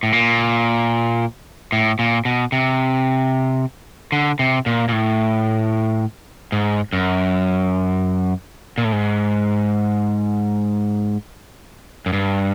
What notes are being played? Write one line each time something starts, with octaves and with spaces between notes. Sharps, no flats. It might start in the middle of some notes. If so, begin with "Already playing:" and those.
A2
A#2
A2
A#2
B2
C3
D3
C3
A#2
A#2
A2
G#2
F#2
A#2
A2
G#2
F#2
G2